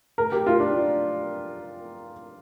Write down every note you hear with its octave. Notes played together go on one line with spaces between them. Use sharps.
A#4
G4
F4
D4